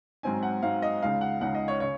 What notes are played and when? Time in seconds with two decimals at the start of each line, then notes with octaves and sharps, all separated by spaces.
0.23 G#2 F#3 C4 D#4 G#5
0.43 F#5
0.63 G#2 F#3 C4 D#4 F5
0.82 D#5
1.02 C#2 C#3 G#3 D#4 F5
1.21 F#5
1.41 C#2 C#3 G#3 D#4 F#5
1.55 D#5
1.68 C#5
1.80 C#3 C#5